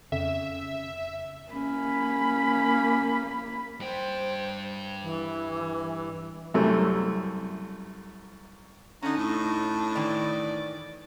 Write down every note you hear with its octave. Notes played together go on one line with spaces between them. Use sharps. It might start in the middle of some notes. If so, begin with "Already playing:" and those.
F2 C#3 E5
A#3 C#4 B5
G2 C5 G5
E3
C2 F#2 C3 A3
D3 C#4 D#4 A#5
A2 D4
D#3 E3 D5